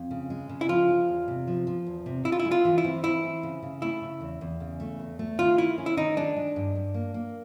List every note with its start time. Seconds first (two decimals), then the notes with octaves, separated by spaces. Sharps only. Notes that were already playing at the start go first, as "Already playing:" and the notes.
Already playing: F2
0.11 C#3
0.30 G#3
0.49 C#3
0.61 E4
0.69 F3 F4
0.89 G#3
1.08 E2
1.28 C3
1.47 F3
1.67 F3
1.87 E2
2.06 C3
2.25 C#3 E4
2.32 F4
2.40 E4
2.45 G#3
2.51 F4
2.65 E3
2.78 E4
2.84 C4
3.04 E3 E4
3.24 C4
3.43 C#3
3.62 C#3
3.82 A3 E4
4.01 C#3
4.21 E2
4.41 E2
4.60 C#3
4.80 A3
5.00 E2
5.19 A3
5.39 D#3 F4
5.58 D#3 E4
5.78 C#4
5.86 E4
5.97 D#3 D#4
6.17 G#3 D4
6.36 G#3
6.56 G2
6.75 G2
6.94 A#3
7.14 A#3